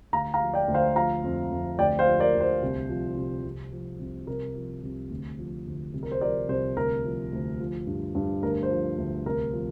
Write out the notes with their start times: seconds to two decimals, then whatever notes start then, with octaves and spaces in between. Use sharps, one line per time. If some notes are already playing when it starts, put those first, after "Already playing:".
0.13 D2 F5 A#5
0.34 F5 A#5
0.41 F3
0.54 D5 G5
0.68 D2
0.74 C5 F5
0.95 F3 F5 A#5
1.24 F2
1.51 F2
1.79 D2 D5 G5
1.99 C5 F5
2.07 F3
2.20 A#4 D5
2.35 D2
2.41 C5
2.62 C2
2.89 F3
3.16 C2
3.44 C2
3.72 F3
3.99 C2
4.27 C2 A#4
4.55 F3
4.83 C2
5.10 D2
5.39 F3
5.66 D2
5.93 C2
6.03 A#4
6.11 C5
6.21 F3 A#4 D5
6.48 C2 C5
6.76 D2 A#4
7.05 F3
7.33 D2
7.60 F3
7.87 G2
8.15 G2
8.42 D2 A#4
8.63 C5
8.71 F3
8.98 D2
9.26 C2 A#4
9.53 F3